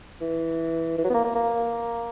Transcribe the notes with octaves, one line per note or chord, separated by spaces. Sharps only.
E3
E3
F#3
B3
A#3
A#3
A#3